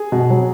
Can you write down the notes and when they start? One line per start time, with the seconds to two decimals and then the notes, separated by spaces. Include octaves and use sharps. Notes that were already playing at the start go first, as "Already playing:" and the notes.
Already playing: G#4
0.12 B2
0.30 F#3